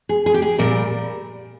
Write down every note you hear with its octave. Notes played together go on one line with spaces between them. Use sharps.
G#4
G#4
G4
G#4
A#2 G3 A#4